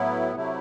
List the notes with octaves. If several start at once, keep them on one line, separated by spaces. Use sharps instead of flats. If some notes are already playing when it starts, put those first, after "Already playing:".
Already playing: A2 F#3 B3 E4
C3 F#3 A3 E4